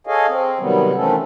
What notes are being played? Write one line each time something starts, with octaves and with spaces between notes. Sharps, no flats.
G#4 A4 C#5 D#5 F5 G#5
C4
C3 D#3 F#3 G3 B3
D#3 E3 A3 C4 C#4 A4